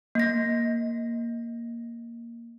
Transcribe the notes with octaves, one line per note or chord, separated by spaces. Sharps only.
A#3 A#6